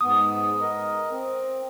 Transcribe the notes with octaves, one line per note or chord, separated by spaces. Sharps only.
G#2 B3 D#6
A#4 D#5
C4